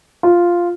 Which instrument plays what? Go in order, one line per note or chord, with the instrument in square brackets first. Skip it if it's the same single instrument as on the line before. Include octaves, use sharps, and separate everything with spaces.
[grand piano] F4